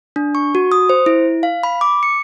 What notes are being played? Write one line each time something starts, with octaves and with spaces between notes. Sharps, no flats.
D4
C#6
F#4
D#6
C5
E4
F5
B5
D6
C#7